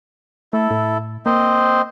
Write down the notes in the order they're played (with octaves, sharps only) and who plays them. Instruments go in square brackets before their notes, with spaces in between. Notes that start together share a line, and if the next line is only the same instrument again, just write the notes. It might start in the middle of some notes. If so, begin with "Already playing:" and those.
[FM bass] A3 [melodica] E4 A4
[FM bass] A2
[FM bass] A#3 [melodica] C4 C5 D#5